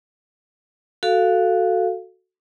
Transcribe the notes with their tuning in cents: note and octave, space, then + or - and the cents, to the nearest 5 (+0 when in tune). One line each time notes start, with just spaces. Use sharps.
F#4 +0 A4 +0 F5 +0